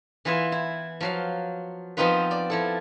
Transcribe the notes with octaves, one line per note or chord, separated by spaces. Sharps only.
E3 B3 F4 B4 E5 G#5
E4
F3 F#3 F5
F3 B3 C4 D#4 F4 B4
D5
F3 E4 A4